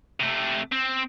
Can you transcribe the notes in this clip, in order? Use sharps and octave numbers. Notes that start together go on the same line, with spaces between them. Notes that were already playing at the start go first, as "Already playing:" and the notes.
C3 A3
C4